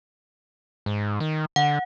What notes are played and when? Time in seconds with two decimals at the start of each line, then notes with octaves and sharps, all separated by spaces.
0.86 G#2
1.20 D#3
1.56 D3 F#5